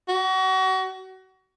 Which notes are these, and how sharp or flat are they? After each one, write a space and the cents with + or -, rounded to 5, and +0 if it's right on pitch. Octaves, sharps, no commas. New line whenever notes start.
F#4 +30